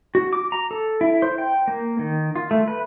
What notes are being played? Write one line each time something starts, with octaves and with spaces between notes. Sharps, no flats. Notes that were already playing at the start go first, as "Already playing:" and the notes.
F#4
D6
A#5
A4
E4
C5
G5
A#3
D#3
F4
A3
B4